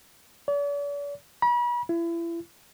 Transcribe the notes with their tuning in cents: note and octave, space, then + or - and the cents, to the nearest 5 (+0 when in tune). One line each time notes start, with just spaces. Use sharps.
D5 -45
B5 -40
E4 +35